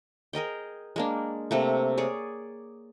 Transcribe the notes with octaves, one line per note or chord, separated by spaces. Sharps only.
G#4 A#4 D#5 G5
G#3 A#3 D4
C3 A3 A#3
G#4 C#5 D5